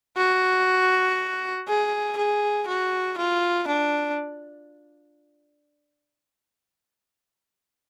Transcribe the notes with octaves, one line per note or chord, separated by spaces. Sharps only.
F#4
G#4
G#4
F#4
F4
D4